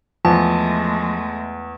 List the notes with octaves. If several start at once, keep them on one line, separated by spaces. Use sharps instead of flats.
E2 F3 G#3 A3 A5